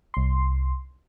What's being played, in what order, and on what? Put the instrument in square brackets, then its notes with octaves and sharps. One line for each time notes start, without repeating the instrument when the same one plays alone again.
[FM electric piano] C2 C6